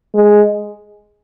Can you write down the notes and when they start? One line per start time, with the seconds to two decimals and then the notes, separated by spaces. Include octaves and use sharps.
0.15 G#3